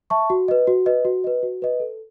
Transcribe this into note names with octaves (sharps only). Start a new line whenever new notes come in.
E5 A5 C#6
F#4
B4 D#5
F#4
B4 D#5
F#4
B4 D#5
F#4
B4 D#5
A4